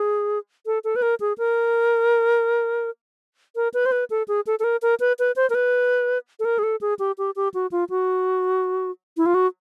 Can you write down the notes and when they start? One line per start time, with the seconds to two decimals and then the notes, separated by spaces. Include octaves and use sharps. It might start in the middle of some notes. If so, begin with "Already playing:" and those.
Already playing: G#4
0.66 A4
0.84 A4
0.96 B4
1.02 A#4
1.20 G#4
1.38 A#4
3.56 A#4
3.74 B4
3.86 C5
3.92 B4
4.10 A4
4.28 G#4
4.47 A4
4.59 A4
4.64 A#4
4.82 A#4
5.00 B4
5.19 B4
5.36 C5
5.50 A#4
5.55 B4
6.39 A4
6.45 A#4
6.59 G#4
6.63 A4
6.81 G#4
6.99 G4
7.18 G4
7.36 G4
7.54 F#4
7.72 F4
7.90 F#4
9.17 E4
9.26 F4
9.34 F#4